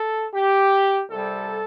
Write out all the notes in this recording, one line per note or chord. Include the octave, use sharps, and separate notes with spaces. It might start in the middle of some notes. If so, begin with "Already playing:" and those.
Already playing: A4
G4
C2 C3 G3 A4